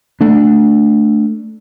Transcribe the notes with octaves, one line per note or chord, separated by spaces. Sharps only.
A3 D4